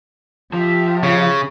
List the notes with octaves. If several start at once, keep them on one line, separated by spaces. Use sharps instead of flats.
F3 G4 E5
C#3